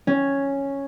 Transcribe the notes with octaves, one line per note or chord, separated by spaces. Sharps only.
C#4